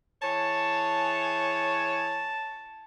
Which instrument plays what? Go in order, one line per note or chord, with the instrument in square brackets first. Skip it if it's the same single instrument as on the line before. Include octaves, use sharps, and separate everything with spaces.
[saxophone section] E3 G#4 C#5 [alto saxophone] A5